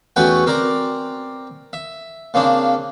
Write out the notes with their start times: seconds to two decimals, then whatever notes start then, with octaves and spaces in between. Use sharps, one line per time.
0.16 E2 A3 C#4 F#4 B4 G5
0.46 C4 A#4 D5 A#5
1.73 E5
2.34 C#3 A#3 C4 D4